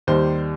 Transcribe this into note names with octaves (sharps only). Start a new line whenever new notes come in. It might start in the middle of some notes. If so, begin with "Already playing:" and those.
D#2 D#3 G3 C5